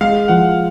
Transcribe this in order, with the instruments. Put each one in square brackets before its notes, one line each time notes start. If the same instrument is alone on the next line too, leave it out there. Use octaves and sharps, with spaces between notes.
[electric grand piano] G#3 [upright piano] F5
[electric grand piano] F3 [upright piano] F#5